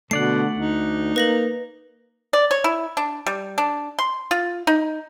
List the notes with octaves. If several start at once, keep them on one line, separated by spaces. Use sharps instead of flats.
B2 D3 A3 D5 F#5 C7
D2 D#4
A#3 B4 A#6 F#7
D5
C#5
E4
D4
G3
D4
C6
F4
D#4